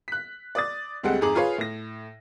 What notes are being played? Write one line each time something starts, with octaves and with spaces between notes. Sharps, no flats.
F#6 B6
D5 D#6 A6
D2 G3 G#3 C4 F#5
F2 G#2 G#4 A#5 D6 F#7
F4 G#4 B4 C#5 F5
A2 A#6